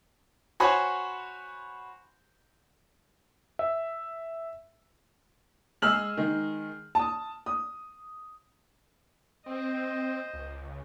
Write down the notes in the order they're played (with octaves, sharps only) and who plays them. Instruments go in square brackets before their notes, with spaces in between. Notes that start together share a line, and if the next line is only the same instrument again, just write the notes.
[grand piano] F#4 C5 C#5 G#5 B5 C6
[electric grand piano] E5
[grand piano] G#3 G#4 E6 F6 F#7
D#3 G#3
A5 D#6
D#6
[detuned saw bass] C4 [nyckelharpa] C5 D#5
[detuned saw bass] C#2